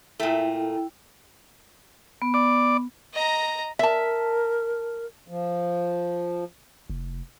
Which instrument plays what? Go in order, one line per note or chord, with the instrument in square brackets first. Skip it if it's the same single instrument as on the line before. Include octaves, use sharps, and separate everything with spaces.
[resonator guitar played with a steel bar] A#2 A3 [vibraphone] E4 G5
[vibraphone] B3
[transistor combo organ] D5
[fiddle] D#5 A#5
[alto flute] A#4 [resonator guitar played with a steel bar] E5 A5
[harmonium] F3
[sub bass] F1